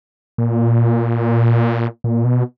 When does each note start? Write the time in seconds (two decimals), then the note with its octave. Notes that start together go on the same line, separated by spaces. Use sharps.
0.38 A#2
2.04 A#2
2.25 B2